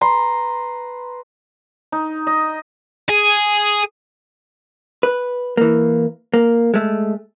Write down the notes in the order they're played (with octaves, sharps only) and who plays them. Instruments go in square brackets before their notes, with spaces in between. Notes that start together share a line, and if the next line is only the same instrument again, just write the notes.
[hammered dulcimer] B4 A#5 C6
D#4
D#5
[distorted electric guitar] G#4
[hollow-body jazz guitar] B4
E3 A#3
A#3
G#3 A3